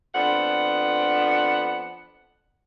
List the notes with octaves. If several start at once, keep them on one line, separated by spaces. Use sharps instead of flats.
F2 B3 D4 F#5